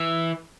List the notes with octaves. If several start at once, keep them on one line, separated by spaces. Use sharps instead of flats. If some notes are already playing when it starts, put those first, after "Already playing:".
Already playing: E3